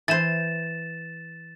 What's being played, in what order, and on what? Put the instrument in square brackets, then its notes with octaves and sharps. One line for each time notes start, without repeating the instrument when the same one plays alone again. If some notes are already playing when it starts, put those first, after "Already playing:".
[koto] E3 C5 [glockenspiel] A6 E7